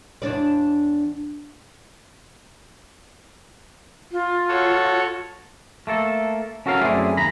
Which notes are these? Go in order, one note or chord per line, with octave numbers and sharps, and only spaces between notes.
E2 D4 D5
F4
F#4 A4 C#5
A3 A#3 A4
C#4 F#4 A4 A#4 F5
F#2 A3 C4 E4 G#4 D5
D#2 A#5 B5